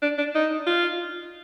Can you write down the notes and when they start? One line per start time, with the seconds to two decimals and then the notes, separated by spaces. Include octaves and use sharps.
0.02 D4
0.18 D4
0.35 D#4
0.67 F4